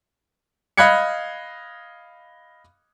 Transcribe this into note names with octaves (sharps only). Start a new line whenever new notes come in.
D#5 F5 B5 F#6 G#6 C#7